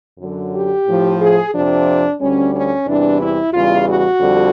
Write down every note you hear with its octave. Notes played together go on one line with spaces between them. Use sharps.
F#2 D3 F#3
G4
A2 F3
G#4
F2 C3 F3 D4
D2 D3 G3 C#4
C#4
E2 C3 E3 G3 D4
E4
E2 C#3 E3 G3 F4
F#4
F2 D3 G3